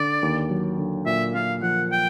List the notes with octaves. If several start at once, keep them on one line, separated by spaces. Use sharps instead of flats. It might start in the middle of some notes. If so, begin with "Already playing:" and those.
Already playing: D3 D5
D#2
F#3
D3
A#2 E5
A#3 F5
F3 F#5
G5